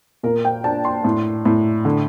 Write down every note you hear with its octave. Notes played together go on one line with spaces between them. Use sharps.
A#2 A#4
G5
D4 A5
C6
A2
A2
D3